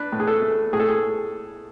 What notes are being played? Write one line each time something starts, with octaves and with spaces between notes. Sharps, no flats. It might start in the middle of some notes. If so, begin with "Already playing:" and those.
Already playing: D4 B4
A2
G#4
A4
A3
A2 G#4
A4
G#4